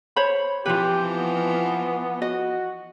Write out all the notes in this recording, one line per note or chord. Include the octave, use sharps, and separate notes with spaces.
C5 C#5 B5
E3 F3 C4 F4 G4 B4
B3
F#4 D#5